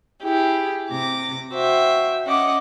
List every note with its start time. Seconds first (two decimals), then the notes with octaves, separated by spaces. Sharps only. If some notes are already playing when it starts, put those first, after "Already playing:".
0.23 E4 G4 G#4
0.92 C3 D6 A#6
1.53 F#4 C5 E5 G5
2.26 C#4 D#5 F#5 D6